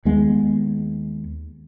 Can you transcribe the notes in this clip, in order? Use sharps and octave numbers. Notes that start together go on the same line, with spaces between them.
D#2 G#3 B3